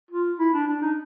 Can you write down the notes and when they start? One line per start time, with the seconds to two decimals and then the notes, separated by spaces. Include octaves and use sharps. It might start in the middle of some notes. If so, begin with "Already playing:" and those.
0.11 F4
0.39 E4
0.54 D4
0.68 D4
0.82 D#4